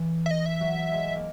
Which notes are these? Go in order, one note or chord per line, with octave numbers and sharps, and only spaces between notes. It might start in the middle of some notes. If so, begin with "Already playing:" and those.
Already playing: E3
E5
D#5
E5
F#3
G#3
A#3